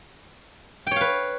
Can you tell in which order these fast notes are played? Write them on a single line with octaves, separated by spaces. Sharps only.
G5 C#5 F5 B4